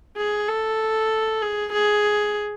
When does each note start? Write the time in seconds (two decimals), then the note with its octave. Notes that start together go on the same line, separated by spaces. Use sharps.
0.17 G#4
0.48 A4
1.42 G#4
1.73 G#4